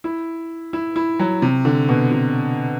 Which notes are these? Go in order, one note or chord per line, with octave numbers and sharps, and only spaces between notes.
E4
E4
E4
F#3
C3
D3
B2
C3